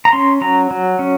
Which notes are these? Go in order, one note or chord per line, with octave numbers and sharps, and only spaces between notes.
A#5
C#4 C6
F#3 A#5
F#3
C#4